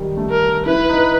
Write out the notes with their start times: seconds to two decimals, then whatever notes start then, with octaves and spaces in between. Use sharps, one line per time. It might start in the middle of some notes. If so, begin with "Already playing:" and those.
Already playing: D#3 G3
0.17 A3
0.30 A#4
0.66 E4 B4
0.89 D#4